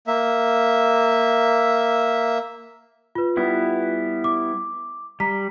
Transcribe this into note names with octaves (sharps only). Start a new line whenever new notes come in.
A#3 E5
F4 B4
G3 B3 E4
D6
G3 A#5 B6